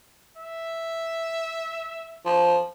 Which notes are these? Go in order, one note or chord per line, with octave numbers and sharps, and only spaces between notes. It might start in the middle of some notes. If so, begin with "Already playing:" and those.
E5
F3